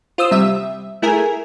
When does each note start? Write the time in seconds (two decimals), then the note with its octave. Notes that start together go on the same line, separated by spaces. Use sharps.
0.18 F4 C5 D#6 E6
0.31 C3 G3 E5
1.02 A3 E4 G#4 A#4 G#5